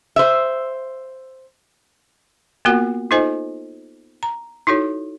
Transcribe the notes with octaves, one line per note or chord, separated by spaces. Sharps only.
C5 E5
A#3 B3 F4 F#4 A#4 F#5
D#4 F4 A4 C5 D#5 G#5
A#5
D#4 E4 F#4 A4 C#5